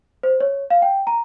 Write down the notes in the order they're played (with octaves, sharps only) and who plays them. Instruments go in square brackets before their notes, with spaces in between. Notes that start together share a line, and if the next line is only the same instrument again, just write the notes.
[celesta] C5
C#5
F5
G5
A#5